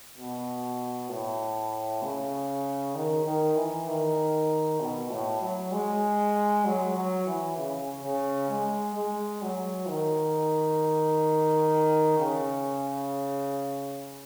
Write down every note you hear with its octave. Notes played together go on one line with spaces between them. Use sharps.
B2
A2
C#3
D#3
D#3
E3
D#3
B2
A2
F#3
G#3
F#3
F#3
E3
C#3
C#3
G#3
G#3
F#3
D#3
C#3